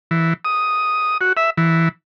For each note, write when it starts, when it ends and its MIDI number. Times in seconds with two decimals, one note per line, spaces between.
0.11 0.33 52
0.45 1.18 87
1.21 1.33 66
1.37 1.50 76
1.57 1.89 52